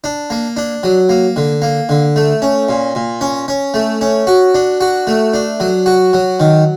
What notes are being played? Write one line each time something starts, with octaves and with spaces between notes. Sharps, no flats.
D4
A#3
D4
F#3
A#3
D3
A#3
D3
A3
C#4
A#2
A#2
C#4
C#4
A3
C#4
F#4
D4
F#4
A3
D4
F#3
F#4
F#3
D#3